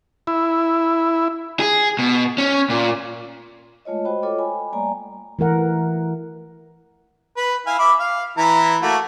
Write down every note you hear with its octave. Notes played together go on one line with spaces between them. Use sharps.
E4
G#4
B2
C#4
A#2
G#3 A3 F4 C#5 D#5
F#4 C5 D#5 G5 B5
F4 A4 C#5 D#5 G5 D6
G5 G#5 B5
G3 A3 A#3 D5 G#5 A#5
E3 A3 A#4 F#5
B4
E4 F5 G#5
E5 B5 D6
F5
E3 E4 A#5
A3 A#3 F#4